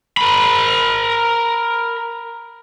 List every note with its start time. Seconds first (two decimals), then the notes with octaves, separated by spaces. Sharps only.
0.17 A#4 B5